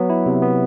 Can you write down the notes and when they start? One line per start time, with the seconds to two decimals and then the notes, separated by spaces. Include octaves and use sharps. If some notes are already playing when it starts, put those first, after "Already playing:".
Already playing: F#3 B3
0.10 E4
0.26 C3
0.42 B3